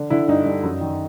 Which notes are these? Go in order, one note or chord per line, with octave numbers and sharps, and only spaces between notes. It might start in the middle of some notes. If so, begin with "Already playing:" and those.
Already playing: D3
D3 E4
G2 D#4
G2
F#2
D#3